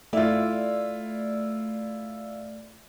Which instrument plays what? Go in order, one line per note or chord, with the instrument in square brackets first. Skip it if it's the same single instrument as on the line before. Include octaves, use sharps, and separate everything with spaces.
[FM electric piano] A3 D5 [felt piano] E4 F4